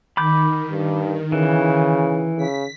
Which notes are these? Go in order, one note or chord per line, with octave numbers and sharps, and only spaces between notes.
D#3 B5 D6 G6
G2
C#3 E3
C#3 B6